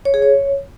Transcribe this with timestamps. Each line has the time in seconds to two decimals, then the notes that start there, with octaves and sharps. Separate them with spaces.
0.05 C#5
0.14 G#4
0.22 C#5